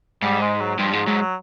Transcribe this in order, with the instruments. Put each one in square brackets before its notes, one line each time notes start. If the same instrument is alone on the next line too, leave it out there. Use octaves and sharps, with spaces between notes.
[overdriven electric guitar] G#2 [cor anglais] G3
[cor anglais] G#3
F#3
[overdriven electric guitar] G2 [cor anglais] F3
[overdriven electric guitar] G#2 [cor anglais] F3
[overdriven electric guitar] G#2 [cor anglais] F#3
[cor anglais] F#3